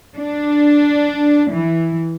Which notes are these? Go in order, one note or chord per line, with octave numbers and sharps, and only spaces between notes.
D4
E3